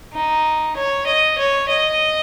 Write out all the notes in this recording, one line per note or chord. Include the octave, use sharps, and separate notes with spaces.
D#4
C#5
D#5
C#5
D#5